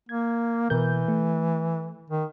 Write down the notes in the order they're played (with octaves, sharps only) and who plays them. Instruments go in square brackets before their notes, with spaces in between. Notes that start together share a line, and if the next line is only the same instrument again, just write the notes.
[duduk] A#3 [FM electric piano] G#6
[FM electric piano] B2 A#4 G6 [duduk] E3
[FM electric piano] A3
[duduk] D#3